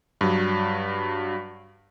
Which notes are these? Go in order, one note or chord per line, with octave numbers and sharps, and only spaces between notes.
G2 F#3